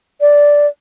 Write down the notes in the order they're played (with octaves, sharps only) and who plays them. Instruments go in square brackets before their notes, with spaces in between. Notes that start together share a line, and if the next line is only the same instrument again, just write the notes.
[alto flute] D5